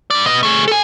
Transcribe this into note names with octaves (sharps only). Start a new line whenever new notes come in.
G2 D5
B3 D#5
A3 G#4
A4 G#5